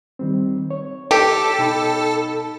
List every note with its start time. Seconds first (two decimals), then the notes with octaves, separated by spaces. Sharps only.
0.19 D#3 G3 C4
0.71 C#5
1.11 G4 A4
1.59 B2 D#4 B5